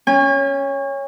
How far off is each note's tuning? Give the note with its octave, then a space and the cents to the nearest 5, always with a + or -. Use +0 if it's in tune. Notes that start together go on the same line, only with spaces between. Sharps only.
C#4 +0 G#5 -40